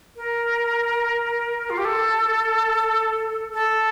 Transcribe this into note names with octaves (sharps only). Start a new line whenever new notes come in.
A#4
F4
G4
A4
A4